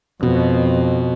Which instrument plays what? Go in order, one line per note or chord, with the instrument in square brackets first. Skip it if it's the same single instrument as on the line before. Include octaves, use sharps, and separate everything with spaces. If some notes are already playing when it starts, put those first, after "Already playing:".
[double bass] F2 [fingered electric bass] B2